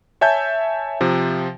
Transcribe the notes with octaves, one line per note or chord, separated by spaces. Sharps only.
C#5 E5 G#5 A5 G6
C3 F3